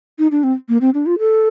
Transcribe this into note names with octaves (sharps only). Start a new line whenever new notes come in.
D#4
D4
C4
A#3
C4
D4
F4
A4